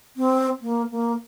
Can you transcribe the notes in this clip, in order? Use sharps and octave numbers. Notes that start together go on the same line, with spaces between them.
C4
A#3
A#3